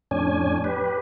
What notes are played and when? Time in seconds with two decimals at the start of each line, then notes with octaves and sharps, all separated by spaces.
0.11 F2 A2 C#4 D4 G#5
0.64 G4 B4